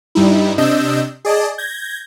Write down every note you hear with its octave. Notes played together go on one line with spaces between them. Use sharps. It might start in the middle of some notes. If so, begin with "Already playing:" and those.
G2 G3 D#4 E4
C3 D4 D#5 E6 G6
G#4 D5 D#5 A5
G6 G#6 A#6